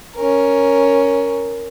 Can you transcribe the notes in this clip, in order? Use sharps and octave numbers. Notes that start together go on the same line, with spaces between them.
C#4 A#4